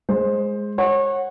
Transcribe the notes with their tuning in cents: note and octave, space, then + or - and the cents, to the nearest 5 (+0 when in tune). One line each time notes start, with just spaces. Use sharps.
G#3 +0 C5 +15
C#5 -30 F#5 +0